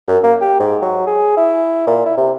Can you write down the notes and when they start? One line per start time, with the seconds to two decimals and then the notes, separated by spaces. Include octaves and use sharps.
0.08 F#2
0.23 A#3
0.41 G4
0.60 G#2
0.82 F#3
1.07 G#4
1.37 E4
1.87 A#2
2.06 E4
2.17 C3